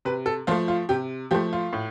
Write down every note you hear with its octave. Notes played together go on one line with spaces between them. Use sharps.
C3 B4
A4
F3 A3 F4
F4
C3 G4
F3 A3 G4
F4
A2